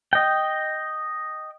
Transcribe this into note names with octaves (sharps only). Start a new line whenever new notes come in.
D#5 G5